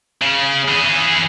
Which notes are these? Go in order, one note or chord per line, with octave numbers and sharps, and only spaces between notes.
C#3
E3 G#4